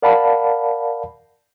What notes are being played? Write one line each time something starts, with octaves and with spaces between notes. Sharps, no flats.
A#4 D5 F5 F#5 A5 B5